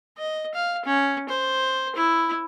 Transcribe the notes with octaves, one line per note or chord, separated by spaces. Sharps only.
D#5
F5
C#4
C5
E4